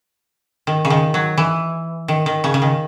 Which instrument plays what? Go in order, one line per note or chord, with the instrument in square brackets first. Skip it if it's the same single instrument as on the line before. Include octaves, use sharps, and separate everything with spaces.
[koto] D#3
C#3
D#3
F#3
E3
D#3
D#3
C#3
C#3
D#3